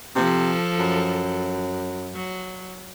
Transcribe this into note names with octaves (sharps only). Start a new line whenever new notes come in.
C3 F3 A4
F#2
F#3